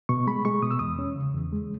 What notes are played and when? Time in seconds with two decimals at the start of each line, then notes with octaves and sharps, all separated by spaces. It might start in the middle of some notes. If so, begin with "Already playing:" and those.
0.09 B2 C#6
0.27 G#3 B5
0.45 G#3 C#6
0.62 B2 D#6
0.71 E6
0.79 E2 D#6
0.99 C#4
1.16 C#3
1.34 E2
1.52 G#3